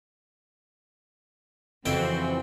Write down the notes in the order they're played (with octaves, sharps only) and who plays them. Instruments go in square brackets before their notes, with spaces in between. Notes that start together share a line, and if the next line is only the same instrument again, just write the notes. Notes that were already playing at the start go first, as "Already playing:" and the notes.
[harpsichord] F2 E5 G5 [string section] C#3 F3 F#4 [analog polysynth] E3 C4